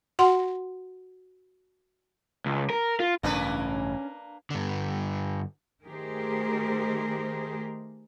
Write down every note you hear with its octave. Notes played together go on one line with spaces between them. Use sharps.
F#4 F#5 C6
C#2
A#4
F4
A1 G2 C#3 A#3 C#4 D4 B4
G2 D3
D#3 A3 G4 G#4 A#4 C5